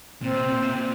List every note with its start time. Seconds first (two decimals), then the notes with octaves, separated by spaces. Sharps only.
0.22 A#2 C4
0.36 C3
0.49 A#2
0.63 C3
0.76 A#2